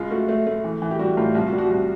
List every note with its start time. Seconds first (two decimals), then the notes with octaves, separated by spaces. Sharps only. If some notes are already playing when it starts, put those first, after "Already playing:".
Already playing: C#2 F4
0.11 A3 F#4
0.29 A3
0.47 A3
0.64 E3
0.82 E3
0.91 G4
0.99 G3 F#4
1.17 A2 F4
1.35 C2 F4
1.47 F#4
1.53 G3
1.58 F#4
1.70 C2